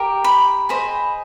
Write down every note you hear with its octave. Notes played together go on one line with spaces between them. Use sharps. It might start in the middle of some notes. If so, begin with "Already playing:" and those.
Already playing: G4 A#4
B5
G#4 C5 D#5 B5